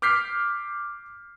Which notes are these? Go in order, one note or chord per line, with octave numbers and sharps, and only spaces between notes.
D6 F6 G6 B6 C7